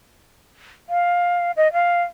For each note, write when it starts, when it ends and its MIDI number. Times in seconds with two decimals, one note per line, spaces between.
0.89 1.51 77
1.57 1.71 75
1.73 2.03 77